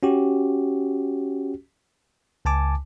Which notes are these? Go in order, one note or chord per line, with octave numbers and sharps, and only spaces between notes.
C#4 F#4 G4
C#2 G#5 A5 D6